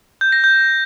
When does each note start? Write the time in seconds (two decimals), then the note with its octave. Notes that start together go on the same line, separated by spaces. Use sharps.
0.21 G6
0.32 A#6
0.44 G6